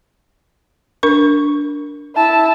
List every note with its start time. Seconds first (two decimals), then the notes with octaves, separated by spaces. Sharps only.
1.03 D4 A#4 C#6
2.16 E4 A5